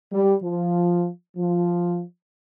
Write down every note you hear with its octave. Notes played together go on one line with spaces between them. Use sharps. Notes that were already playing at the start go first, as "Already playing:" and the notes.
G3
F3
F3